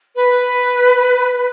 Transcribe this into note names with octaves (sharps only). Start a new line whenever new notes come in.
B4